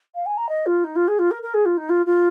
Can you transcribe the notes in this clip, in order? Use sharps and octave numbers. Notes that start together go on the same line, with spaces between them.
F5
G#5
A#5
D#5
F4
D#4
F4
G#4
F4
A#4
A#4
G#4
F4
D#4
F4
F4